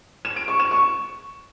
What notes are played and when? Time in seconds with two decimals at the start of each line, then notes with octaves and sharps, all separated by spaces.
0.25 E7
0.36 D7
0.48 C#6
0.60 E7
0.71 C#6